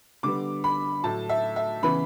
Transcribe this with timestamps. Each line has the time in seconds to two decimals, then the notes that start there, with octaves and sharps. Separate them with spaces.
0.23 D3 G3 B3 D6
0.64 B5
1.04 A2 F#3 A3 A5
1.29 E5
1.56 E5
1.83 C#3 E3 B3 B5